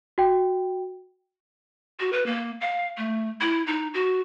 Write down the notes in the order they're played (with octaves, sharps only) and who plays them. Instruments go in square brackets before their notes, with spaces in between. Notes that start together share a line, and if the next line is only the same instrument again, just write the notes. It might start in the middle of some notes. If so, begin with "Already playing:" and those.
[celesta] F#4 G5
[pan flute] F#4
B4
A#3
F5
A3
E4
D#4
F#4